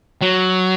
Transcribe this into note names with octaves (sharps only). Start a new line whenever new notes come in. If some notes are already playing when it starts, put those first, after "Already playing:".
F#3